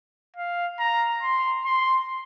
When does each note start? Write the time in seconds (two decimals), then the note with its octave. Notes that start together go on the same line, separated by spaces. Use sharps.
0.36 F5
0.80 A#5
1.22 C6
1.66 C6